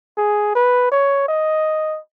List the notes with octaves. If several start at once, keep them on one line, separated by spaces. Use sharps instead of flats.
G#4
B4
C#5
D#5